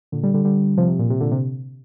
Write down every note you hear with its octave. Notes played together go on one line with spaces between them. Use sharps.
A#2 D3
D3 G3
D3 G3
D3 G3
C3 F3
C3
A#2
C3
A#2 D3
C3